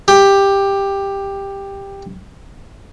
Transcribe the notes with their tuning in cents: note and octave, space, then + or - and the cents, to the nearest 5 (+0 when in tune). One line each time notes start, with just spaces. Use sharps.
G4 +10